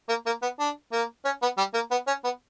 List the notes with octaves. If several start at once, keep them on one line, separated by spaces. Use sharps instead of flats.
A#3
A#3
B3
D4
A#3
C#4
B3
G3
A#3
B3
C#4
B3